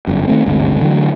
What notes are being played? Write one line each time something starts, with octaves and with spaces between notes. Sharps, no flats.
G1 F#2
D#3 A3 C4
G1 D2 G#2 C3
D3 E3 F#3 A3